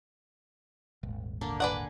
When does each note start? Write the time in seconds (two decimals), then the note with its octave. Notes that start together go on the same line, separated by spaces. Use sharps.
1.03 D#1 G#1
1.41 D3 A#3 D4
1.60 B4 D5 F#5 G#5